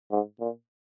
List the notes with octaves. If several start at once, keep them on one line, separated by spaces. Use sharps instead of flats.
G#2
A#2